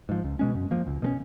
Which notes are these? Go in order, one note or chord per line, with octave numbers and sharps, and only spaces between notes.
G#2 F3
C#2
B2 G#3 C#4
F#2
F3 A#3
C#2
B2 G#3 C#4